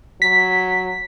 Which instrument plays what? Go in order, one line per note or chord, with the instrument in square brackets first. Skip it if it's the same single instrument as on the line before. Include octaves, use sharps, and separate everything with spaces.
[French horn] F#3 [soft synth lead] B6